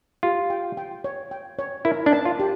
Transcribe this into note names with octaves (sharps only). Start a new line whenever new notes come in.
F4 G4
G5
G5
C#5
G5
C#5
E4 A#4
D4
A5
F4
G4